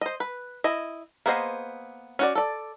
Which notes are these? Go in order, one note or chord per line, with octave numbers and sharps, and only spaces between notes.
C5 D#5
B4
E4 D#5
A#3 B3 G#4 C5 D#5
C#4 F#4 D5
A4 D5